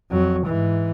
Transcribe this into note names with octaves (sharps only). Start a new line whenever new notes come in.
F2 F#3
G#2 E3